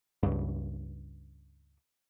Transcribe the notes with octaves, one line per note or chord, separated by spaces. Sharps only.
C#2 G2